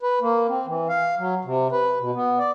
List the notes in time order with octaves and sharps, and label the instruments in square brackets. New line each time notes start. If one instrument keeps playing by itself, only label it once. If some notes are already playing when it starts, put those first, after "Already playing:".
[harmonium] B4
A#3
C4
E3
F5
F#3
C3
B4
B2
B3
D5